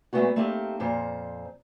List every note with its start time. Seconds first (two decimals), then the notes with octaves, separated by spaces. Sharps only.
0.13 A#2 G#3 A3 B3 C#4 F#4
0.36 A3 A#3 C4 D#4 G4
0.80 F2 A#2 C5 A#5